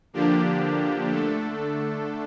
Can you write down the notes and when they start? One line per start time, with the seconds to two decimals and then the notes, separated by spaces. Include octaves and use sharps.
0.13 D3 F3 A#3 D4 G4
1.11 D3 A3 D4 A4